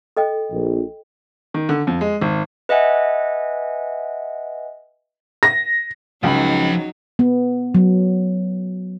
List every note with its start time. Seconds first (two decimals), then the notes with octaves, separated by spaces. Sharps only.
0.17 A4 D#5 G5
0.51 A#1
1.54 D#3
1.69 D3
1.87 F2
2.01 G#3
2.21 G#1
2.69 B4 D#5 E5 F#5 G#5
5.43 A#6
6.23 C#2 F3 F#3 D#4 B5
7.19 B3
7.75 F#3